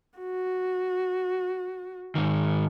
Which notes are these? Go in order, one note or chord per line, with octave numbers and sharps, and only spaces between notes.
F#4
G#2 D#3